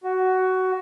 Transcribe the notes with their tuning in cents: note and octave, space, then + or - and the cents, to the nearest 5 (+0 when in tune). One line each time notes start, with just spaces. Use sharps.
F#4 +15